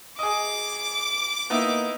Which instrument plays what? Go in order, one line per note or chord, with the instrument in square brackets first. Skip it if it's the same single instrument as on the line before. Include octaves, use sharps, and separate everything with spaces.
[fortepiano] G#4 D#5 [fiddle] D6
[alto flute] A#3 [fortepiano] B3 D#4 E4